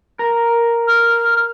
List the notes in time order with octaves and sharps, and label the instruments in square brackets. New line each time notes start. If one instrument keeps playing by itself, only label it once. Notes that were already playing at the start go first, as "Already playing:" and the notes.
[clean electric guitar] A#4
[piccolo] F6